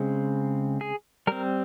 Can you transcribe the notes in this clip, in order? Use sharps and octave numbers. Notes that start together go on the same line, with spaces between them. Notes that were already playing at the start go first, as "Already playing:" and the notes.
Already playing: C#3 G#3 C4
G#4
G3 C4 A#4